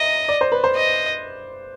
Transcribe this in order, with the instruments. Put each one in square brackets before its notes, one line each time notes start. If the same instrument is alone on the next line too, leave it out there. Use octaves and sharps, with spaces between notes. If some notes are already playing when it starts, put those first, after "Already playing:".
Already playing: [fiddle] D#5 [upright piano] E5 A#5
[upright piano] D5
C5
B4
C5
[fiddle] D#5